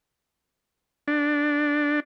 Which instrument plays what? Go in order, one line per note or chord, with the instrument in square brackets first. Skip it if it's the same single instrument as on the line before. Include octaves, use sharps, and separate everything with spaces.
[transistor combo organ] D4